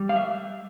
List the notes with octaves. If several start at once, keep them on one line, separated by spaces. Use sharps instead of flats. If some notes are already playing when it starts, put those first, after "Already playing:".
Already playing: G3
F5
E5